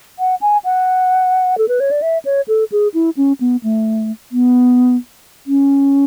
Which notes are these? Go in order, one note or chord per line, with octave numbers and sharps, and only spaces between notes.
F#5
G#5
F#5
A4
B4
C#5
D5
E5
C#5
A4
G#4
E4
C#4
B3
A3
B3
C#4